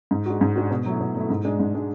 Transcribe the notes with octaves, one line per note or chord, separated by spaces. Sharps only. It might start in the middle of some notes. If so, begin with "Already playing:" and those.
G#2
G#3 D4 F#4
G#2
G#3 D4 F#4
B2
F#3 A3 E4
B2
F#3 A3 E4
G#2
G#3 D4
G#2
G#3 D4